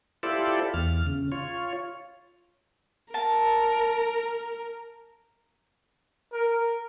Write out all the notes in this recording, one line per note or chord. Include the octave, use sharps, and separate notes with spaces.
E4 F4 G4 A4 C5 D5
E2 F6
C#3
F4 C#5
A#4 A5
A#4